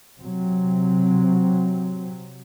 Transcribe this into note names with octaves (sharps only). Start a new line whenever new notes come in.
C3 F#3 C4